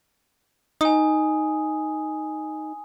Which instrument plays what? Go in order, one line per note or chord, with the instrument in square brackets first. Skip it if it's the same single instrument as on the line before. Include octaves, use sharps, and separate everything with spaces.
[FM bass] D#4 [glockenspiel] G#5 D#6